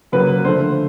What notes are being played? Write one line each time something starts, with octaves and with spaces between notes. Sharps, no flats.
C#3 F#3 A#3 B4
D3 F3 A3 C5